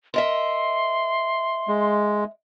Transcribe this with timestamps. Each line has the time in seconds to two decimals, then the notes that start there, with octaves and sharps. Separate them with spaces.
0.14 A#4 D#5 E5 C6
1.68 G#3